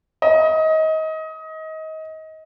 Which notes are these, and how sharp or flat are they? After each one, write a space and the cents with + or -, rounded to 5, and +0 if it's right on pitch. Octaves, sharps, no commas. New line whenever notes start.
D#5 +25